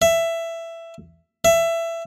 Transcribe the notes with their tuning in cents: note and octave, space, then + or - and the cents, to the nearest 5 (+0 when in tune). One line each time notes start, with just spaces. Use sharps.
E5 +15
E5 +20